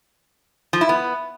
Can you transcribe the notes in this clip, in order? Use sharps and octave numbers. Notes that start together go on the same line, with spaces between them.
F3
E4
B3